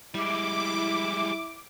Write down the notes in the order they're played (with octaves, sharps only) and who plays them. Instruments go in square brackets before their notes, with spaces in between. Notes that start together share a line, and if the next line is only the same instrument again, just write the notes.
[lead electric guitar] G3 G#3 [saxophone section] E4 [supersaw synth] D6